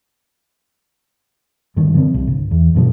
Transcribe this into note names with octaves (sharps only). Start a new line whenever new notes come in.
G1 G2 D#3
D3 F3 G#3 C4
C2
G1
E2
F#2 B2 F3